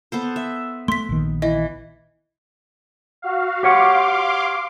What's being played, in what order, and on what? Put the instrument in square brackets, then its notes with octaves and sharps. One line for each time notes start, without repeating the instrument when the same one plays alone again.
[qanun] B3 A4 C5
E5
[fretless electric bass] A3 [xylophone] C6 B6
[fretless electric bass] A#1 D#3
[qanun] E3 [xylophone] D#5
[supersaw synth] F#4 F5
[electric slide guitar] G4 C#5 F#5 [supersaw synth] F5 C6 D6